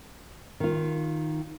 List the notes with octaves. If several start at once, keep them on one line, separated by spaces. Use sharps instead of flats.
D#3 F4